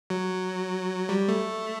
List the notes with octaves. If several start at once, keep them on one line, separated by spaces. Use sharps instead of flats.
F#3
G3
A3